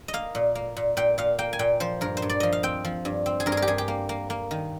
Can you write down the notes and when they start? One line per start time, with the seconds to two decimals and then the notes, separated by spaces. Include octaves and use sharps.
0.08 D#5
0.13 A#3 F5
0.35 A#2
0.55 A#3
0.76 A#2
0.97 A#2 G5
1.18 A#2 F5
1.39 A#3 G5
1.53 G#5
1.59 A#2 G5
1.80 F3 C5
2.01 G2 A#4
2.17 C5
2.22 G2
2.30 D5
2.40 F3 D#5
2.52 F5
2.63 C4 G5
2.85 F3
3.05 G2
3.26 C4
3.40 G#4
3.46 G2 A#4
3.52 G#4
3.57 A#4
3.62 G4
3.67 G2 G#4
3.78 G4
3.88 A#3
4.09 A#3
4.30 A#3
4.51 D#3